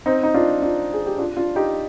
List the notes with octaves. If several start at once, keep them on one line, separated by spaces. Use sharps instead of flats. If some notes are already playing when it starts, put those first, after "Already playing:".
C4 D#4
D#4
D4 F4
D4 F4
G#4
G4
D4 F4
D4 F4
D#4 G4